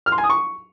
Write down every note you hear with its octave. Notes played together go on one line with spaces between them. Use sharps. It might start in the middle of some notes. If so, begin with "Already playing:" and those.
F6
C6
G#5
D#6
C#6